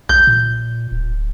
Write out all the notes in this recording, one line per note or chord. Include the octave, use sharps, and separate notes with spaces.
B1 G6
A#2
D1